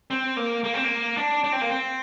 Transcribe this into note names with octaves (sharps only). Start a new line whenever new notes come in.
C4
A#3
A#3
C4
A#3
D4
D4
C4
A#3
C4